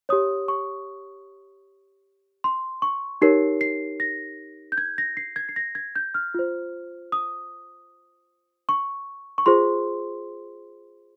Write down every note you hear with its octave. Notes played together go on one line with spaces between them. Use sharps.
G4 C#5 D#6
C#6
C6
C#6
D#4 G4 A#4 C#5 C7
C7
A#6
G6
G#6
A#6
C7
G#6
C7
A#6
G#6
G6
F6
F4 C5
D#6
C#6
C#6
F4 G#4 C5 C6